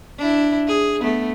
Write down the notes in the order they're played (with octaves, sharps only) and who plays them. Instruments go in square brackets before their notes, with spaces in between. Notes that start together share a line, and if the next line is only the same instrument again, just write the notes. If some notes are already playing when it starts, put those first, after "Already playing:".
[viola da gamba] D4 E4
G#4
A3 B3